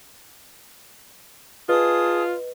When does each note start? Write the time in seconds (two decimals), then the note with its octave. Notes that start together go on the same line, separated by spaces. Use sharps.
1.69 F4 G#4 B4 D#5 A5 D#6